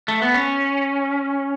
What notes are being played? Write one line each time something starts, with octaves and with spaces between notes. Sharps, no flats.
A3
B3
C#4